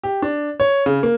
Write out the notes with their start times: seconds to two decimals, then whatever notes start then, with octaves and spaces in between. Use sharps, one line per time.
0.03 G4
0.22 D4
0.60 C#5
0.86 C#3
1.03 A#3